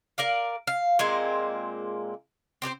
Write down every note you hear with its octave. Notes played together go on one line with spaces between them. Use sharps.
A#4 D5 F5
F5
A#2 G#3 A#3 C4
C4 G4 G#4 C5